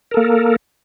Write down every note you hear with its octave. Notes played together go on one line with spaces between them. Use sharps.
A#3 A4 A#4